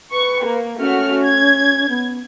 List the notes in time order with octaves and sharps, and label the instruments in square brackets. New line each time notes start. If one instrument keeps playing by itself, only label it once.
[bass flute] B4 [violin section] C#6
[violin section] A#3
[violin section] A3 F#4 F6 [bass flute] C#4
[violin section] G#6
[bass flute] B3